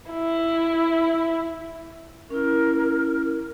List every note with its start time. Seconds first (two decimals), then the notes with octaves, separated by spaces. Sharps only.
0.11 E4
2.30 C#4 E4 A#4